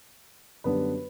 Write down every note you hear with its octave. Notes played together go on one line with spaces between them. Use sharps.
F#2 D3 G3 B3 D4 B4